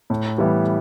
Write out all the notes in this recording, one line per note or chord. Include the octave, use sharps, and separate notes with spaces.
A2
E3 G3 B3 E4